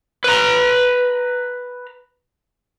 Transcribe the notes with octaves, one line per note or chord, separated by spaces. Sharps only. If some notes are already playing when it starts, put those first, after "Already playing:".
B4 A#5